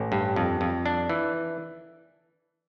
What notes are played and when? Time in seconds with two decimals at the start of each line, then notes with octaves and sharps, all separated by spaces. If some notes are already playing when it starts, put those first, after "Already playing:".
Already playing: A1
0.12 G2
0.36 F2
0.61 F2
0.86 D4
1.09 E3